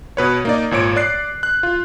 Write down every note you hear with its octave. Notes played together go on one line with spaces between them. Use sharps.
B2 B4 C#5
A#3 D#4 D5
G#1 A#2 C#5 D7
D5 F#6 C7
F#6
F4